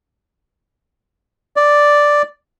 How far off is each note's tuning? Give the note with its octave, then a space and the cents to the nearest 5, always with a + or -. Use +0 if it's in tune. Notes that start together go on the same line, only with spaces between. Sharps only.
D5 +0